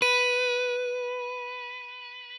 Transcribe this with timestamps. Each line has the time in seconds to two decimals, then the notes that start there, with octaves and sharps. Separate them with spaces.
0.02 B4 D#7